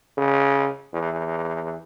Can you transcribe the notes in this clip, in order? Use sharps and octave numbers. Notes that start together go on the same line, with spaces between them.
C#3
E2